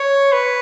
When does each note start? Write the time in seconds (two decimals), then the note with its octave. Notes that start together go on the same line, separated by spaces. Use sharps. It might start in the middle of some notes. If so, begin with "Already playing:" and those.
Already playing: C#5
0.33 B4